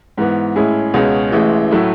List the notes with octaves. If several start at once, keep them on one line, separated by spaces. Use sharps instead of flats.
G#2 E3 B3
A2 G#3 C#4 E4 G#4
C#2 B2 G#3 C#4 F#4
A1 A2 E3 G#3
A2 F#3 A3 E4